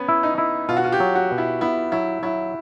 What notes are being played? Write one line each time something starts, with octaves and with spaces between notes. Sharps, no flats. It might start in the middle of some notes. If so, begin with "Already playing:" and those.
Already playing: B3 C#4
E4
D#4
E4
B2 F4
F#4
F4
G4
F#3
F#4
B2
E4
B3 E4
F#3 E4
F#3 E4